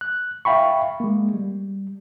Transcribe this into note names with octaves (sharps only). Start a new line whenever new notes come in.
F#6
E5 F5 G5 B5 C#6
G#3 A#3
G3